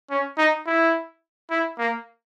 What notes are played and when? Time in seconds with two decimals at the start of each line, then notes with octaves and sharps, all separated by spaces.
0.10 C#4
0.38 D#4
0.67 E4
1.50 E4
1.79 A#3